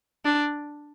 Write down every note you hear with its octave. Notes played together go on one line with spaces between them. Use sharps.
D4